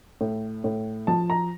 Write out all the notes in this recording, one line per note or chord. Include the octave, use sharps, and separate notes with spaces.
A2
A2
F3 A5
A#5